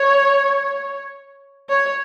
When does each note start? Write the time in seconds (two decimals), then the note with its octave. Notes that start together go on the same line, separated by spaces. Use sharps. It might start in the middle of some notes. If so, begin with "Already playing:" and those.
Already playing: C#5
1.69 C#5